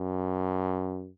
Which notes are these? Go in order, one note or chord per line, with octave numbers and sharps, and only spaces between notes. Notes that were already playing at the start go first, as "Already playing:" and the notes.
Already playing: F#2